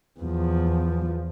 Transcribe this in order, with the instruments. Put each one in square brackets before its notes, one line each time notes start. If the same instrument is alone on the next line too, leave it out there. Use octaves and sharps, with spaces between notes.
[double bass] E2 F3